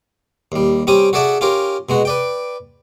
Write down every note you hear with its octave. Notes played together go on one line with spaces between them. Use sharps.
D#2 G3
G3 C4 C#4 G4 D#6
F#4 G#4 A4 D5 E5 F#5
C#4 F4 G4 A#4
B2 G#3 F#4
B4 D5 G5